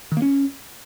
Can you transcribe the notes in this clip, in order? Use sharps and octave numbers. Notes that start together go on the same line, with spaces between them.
D#3
A#3
C#4